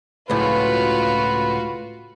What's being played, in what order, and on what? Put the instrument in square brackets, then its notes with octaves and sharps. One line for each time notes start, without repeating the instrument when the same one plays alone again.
[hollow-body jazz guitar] C#2 A2 [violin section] F4 F#4 [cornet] B4